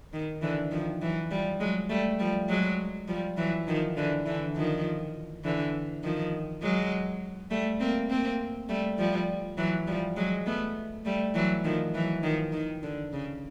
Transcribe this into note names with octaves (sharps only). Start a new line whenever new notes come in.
D#3
D3 E3
D#3 F3
E3 F#3
F3 G3
F#3 G#3
G3 A3
F3 G3
F#3 G#3
F3 G3
E3 F#3
D#3 F3
D3 E3
D3 E3
D#3 F3
D3 E3
D#3 F3
F#3 G#3
G3 A3
A#3 C4
A#3 C4
G3 A3
F3 G3
E3 F#3
F3 G3
F#3 G#3
A3 B3
G3 A3
E3 F#3
D#3 F3
E3 F#3
D#3 F3
D#3
D3
C#3